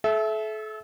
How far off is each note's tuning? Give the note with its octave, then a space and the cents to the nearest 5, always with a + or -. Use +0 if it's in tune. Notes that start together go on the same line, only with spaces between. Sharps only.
A4 -35 E5 +0